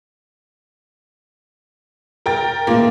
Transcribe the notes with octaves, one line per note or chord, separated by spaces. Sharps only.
A#4 G5 A6
A2 D#3 A#3 F4